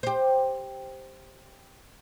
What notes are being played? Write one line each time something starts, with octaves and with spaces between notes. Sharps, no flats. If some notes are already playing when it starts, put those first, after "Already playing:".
G4 C5